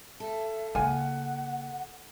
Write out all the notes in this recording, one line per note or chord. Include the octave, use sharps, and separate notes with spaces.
A4 E5
C#3 A#3 F4 F#5 G#5